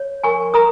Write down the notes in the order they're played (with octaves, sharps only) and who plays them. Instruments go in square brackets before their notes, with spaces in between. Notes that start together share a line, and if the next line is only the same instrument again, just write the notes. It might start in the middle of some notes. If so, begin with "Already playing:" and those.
Already playing: [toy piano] C#5
A#4 G#5 C#6
A#4 A#5 D#6